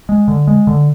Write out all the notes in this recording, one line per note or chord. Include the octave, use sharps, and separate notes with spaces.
G#3
D3
G#3
D3